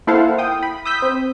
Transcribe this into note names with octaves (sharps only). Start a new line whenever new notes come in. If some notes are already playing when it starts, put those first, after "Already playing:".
A#3 E4 A4 C5 F5 F#5
G5 D#6
B5
D#6 E6 G6 B6
C4